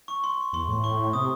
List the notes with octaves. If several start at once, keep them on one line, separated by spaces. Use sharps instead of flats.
C#6
C6
E2 C6
A2
C#6
C3 D#6